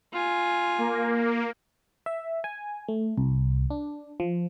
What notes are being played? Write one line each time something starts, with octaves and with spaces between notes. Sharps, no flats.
F4 G#5
A#3
E5
G#5
A3
C2
D4
F3